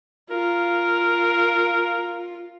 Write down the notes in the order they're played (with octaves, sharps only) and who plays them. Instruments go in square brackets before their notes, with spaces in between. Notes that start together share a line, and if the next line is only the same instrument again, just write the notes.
[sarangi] F4 [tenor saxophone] A#4